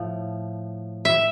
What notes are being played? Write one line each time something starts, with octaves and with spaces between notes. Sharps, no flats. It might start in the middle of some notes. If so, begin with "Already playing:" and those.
Already playing: A2 F3
E5